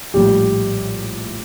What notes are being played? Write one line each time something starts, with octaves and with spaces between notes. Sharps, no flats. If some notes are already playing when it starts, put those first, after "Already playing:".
A#1 A2 G3 G4